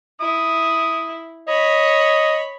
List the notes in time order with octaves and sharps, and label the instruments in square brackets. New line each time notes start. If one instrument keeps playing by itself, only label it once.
[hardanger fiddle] E4 [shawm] D#6
[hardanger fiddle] C#5 B5 [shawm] D#5